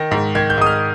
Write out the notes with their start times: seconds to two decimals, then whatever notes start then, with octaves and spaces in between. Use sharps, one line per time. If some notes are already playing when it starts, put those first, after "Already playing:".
Already playing: D#3 A#6
0.11 G#2
0.35 D#3 G#6
0.50 G6
0.58 G#2 D#6
0.66 F6